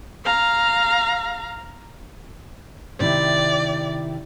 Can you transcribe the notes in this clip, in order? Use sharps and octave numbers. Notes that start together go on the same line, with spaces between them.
F5 A#5
C3 D#3 E4 D5